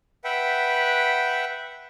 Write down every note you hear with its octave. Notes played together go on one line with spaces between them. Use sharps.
B4 E5 F#5 G5